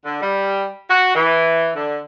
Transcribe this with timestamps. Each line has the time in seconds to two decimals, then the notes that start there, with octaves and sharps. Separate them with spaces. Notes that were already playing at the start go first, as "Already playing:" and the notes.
0.05 D3
0.22 G3
0.90 F#4
1.15 E3
1.75 D3